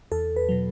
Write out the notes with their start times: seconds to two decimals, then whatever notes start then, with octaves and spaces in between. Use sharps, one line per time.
0.12 E2 A4
0.36 B4
0.49 B2 F#3